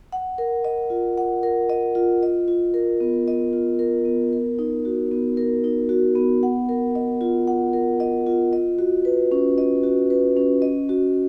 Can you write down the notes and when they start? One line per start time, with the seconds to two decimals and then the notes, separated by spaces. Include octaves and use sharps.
0.12 F#5
0.38 A#4
0.65 D#5
0.90 F4
1.18 F#5
1.43 A#4
1.70 D#5
1.95 F4
2.23 D#5
2.48 F4
2.74 A#4
3.00 B3
3.28 D#5
3.53 F4
3.79 A#4
4.05 B3
4.33 A#4
4.59 D#4
4.85 F#4
5.12 B3
5.37 A#4
5.64 D#4
5.89 F#4
6.15 B3
6.43 F#5
6.69 A#4
6.95 D#5
7.21 F4
7.48 F#5
7.73 A#4
8.00 D#5
8.26 F4
8.53 D#5
8.78 F#4
9.05 B4
9.32 C#4
9.58 D#5
9.83 F#4
10.10 B4
10.37 C#4
10.62 D#5
10.89 F#4